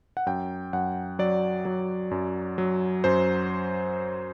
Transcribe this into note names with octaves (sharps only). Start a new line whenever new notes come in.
F#5
F#2 G5
F#2 F#5
F#3 D5
F#3
F#2
F#3
F#2 C5